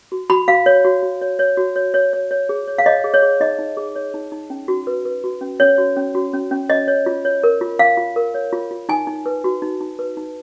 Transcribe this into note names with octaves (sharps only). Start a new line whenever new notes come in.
F#4
F#4 B5
F#4 F5
C#5
F#4
F#4
C#5
C#5
F#4
C#5
C#5
C#5
C#5
G#4
C#5
F5
C#5 D#5
G#4
C#5
G#4
D#4 D#5
D#4
G#4
C#5
D#4
D#4
C#4
F#4
B4
B4
F#4
C#4
C#4 C#5
F#4
C#4
F#4
C#4
C#4
C#5 D#5
C#5
F4
C#5
A#4
F4
F4 F5
F4
A#4
C#5
F4
F4
D#4 G#5
D#4
B4
F#4
D#4
D#4
B4
D#4